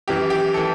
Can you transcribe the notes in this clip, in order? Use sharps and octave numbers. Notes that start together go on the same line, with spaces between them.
F#2 E3 G4
G4
E3 A4